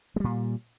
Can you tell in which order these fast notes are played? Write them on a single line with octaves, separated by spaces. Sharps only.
G#3 G3 A#2